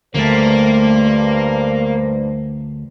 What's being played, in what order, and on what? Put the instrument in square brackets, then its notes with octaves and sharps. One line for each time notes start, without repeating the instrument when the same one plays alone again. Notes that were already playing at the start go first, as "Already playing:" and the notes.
[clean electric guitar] D2 A3 [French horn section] G2 C5 [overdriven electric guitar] A#3